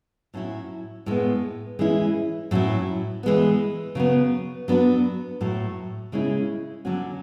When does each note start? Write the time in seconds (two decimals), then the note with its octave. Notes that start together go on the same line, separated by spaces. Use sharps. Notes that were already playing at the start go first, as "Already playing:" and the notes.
0.34 A2 F#3 C#4 E4
1.06 A2 G#3 B3
1.79 E3 G#3 C#4 E4
2.51 A2 F#3 C#4 E4
3.23 E3 G#3 B3
3.95 C#3 F#3 B3
4.68 F#3 B3 D4 F#4
5.41 A2 F#3 A3
6.12 C#3 G#3 C#4 E4
6.85 D3 F#3 C#4 F#4